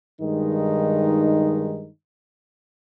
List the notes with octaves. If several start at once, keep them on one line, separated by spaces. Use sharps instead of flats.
G2 D#3 G#3 D#4